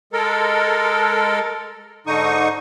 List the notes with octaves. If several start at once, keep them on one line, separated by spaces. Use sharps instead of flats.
G#3 A4 A#4
G#2 D3 D#4 C#6 D#6